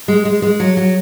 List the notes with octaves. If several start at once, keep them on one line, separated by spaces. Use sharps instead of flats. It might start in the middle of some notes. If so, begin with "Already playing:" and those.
G#3
G#3
G#3
F#3
F#3